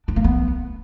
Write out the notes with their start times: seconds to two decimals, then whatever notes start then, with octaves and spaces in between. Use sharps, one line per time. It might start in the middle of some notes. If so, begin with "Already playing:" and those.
0.08 D4
0.16 A#3
0.24 B3